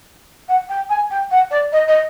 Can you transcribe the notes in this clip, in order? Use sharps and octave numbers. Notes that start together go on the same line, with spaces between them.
F#5
G5
G#5
G5
F#5
D5
D#5
D#5